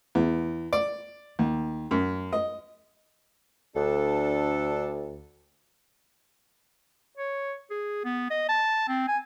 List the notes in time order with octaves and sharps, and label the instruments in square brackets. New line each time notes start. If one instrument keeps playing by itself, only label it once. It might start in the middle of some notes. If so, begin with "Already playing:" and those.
[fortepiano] E2
D5
D#2
F#2
D#5
[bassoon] D2 [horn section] D4 A4
[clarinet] C#5
G#4
B3
D#5
A5
C4
G#5